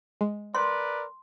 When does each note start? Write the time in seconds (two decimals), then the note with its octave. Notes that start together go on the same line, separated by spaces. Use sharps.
0.21 G#3
0.55 A#4 B4 D5 C6